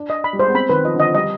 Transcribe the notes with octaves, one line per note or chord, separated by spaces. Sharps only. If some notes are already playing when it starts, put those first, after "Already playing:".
Already playing: D4
D#5
B5
G3
G#3 C5
B3
C4 B5
D#3 B4
F3 D#5
D3
D#5
F3
G3 D#5